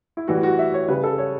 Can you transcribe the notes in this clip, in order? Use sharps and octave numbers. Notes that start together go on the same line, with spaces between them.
E4
A2 E3 G3 F#4
F#4
E5
C#5
C#3 G3 B4
A4
C#5